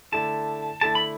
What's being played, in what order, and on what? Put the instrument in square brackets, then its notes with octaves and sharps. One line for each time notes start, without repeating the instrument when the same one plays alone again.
[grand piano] D3 A3 E4 [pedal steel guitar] A5
[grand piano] D3 A3 E4 [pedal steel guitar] A5
[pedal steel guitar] B5